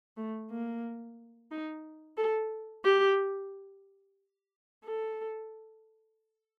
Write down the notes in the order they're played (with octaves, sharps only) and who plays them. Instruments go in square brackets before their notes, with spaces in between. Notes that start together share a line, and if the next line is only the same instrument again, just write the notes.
[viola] A3
A#3
D#4
A4
G4
A4